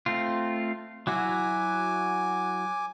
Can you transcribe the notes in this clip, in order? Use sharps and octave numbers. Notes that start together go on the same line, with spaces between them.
A3 C4 F4
F#3 E4 F#4 G#5 D6